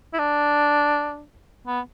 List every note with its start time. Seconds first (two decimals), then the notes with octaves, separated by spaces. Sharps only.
0.13 E4
0.19 D4
1.67 B3